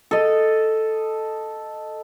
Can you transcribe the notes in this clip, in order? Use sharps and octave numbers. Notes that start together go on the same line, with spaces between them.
A4 D#5